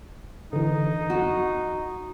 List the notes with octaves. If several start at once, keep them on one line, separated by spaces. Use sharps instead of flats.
D3 E3 D#4
F#4